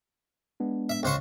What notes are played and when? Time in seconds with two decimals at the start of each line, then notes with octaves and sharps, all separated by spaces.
0.60 G#3 B3 D4
0.89 E5
1.03 C#2 C5 C#6